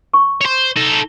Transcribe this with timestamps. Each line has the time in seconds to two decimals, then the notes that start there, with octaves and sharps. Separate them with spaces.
0.14 C#6
0.41 C5 C#5
0.76 D#4 A4